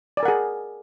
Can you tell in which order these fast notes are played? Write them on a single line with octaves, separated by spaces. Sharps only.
D5 G#5 A#4 F#5 G#4